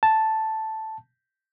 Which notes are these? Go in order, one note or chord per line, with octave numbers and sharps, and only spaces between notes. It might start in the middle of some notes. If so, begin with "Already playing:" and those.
A5